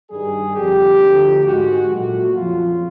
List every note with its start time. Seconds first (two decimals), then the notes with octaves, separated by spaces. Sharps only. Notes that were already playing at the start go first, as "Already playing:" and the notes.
0.10 G2 D#3 G3 G#4
0.55 F2 D3 G3 G4
1.00 D2 D3 F3
1.45 G#2 D#3 G#3 F#4
1.90 A#2 F#3 A3 F#4
2.35 F2 C#3 F3 F4